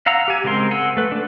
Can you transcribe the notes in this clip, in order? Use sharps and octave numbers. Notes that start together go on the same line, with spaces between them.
F5 F#5 A#5 E6
G4 G#5
C#3 G#3 C4 A#4 C6
F#5 G#5 C6 E6
A3 B4
D4 A4